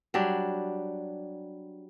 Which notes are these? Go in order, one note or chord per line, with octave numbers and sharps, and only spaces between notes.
F#3 G3 D4